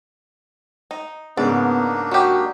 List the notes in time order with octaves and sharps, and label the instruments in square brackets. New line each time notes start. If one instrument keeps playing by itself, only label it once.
[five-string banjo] D#4
[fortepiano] G#2 C#3 [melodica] A#3 D4 D#4 [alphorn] B3 [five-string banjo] D5
[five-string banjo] F#3 G4 [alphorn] F#4